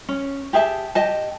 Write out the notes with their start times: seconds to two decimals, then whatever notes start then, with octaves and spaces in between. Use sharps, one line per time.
0.09 C#4
0.53 G4 G#4 E5 A5
0.95 G4 D#5 A5